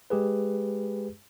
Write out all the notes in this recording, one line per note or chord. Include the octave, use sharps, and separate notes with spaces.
G#3 G4 G#4 B4